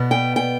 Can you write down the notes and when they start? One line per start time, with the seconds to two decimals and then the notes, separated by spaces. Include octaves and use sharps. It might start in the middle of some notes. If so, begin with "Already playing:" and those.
Already playing: B2 B3
0.11 G5
0.36 G5